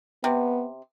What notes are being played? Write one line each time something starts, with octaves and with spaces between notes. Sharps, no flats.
C3 B3